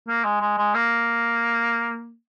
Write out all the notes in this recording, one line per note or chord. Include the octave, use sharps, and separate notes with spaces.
A#3
G#3
G#3
G#3
A#3